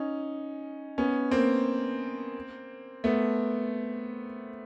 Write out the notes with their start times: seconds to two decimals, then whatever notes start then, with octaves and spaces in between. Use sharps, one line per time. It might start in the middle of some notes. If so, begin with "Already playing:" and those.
Already playing: C#4 D#4
0.98 B3 C#4
1.31 A#3 C4
3.04 A3 B3